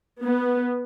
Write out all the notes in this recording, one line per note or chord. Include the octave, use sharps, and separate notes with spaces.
B3